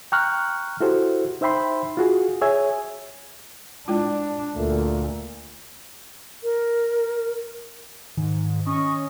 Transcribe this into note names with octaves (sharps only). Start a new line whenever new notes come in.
G5 A#5 C#6 F6 F#6
E4 F#4 G4 A4 C5
D#4 C5 E5 G5 B5 C6
F4 F#4 G#4
G#4 C#5 E5 G#5
G#3 D4 E4 F4
D2 A#2 A3
A#4
G#2 D#3
C#4 D#5 C#6